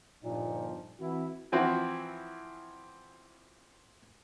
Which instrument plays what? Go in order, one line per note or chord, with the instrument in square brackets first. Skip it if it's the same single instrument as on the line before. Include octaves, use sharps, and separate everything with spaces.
[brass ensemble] G1 F3 D#4 [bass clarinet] A#2
[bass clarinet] E3 [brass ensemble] C4 E4 F#4
[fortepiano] E3 F3 C4 E4 F#4